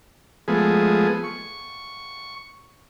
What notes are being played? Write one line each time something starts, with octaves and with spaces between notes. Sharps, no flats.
F3 G#3 A3 B3 G#4
C#6